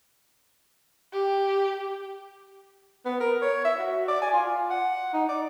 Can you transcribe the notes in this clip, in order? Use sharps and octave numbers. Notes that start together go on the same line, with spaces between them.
G4
B3
A#4
C#5
E5
F#4
D5
G#5
F4
F#5
D#4
D5